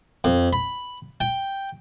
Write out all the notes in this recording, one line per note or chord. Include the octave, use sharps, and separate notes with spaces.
F2
B5
G5